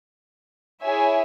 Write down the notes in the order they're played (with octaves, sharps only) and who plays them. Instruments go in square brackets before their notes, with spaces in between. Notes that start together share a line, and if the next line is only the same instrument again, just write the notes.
[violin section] E4 G#4 C#5 E5 G#5